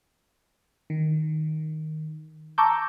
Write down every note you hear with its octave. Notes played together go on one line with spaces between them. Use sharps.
D#3
A5 A#5 C#6 D6 E6 G6